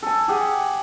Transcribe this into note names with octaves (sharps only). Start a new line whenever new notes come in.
A4 G#5
G4 G#4 F#5